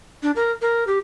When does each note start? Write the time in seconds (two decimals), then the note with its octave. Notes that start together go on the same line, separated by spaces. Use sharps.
0.23 D4
0.36 A#4
0.62 A#4
0.87 G4